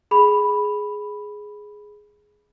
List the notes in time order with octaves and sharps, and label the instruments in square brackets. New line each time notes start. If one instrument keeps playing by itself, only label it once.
[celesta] G#4 B5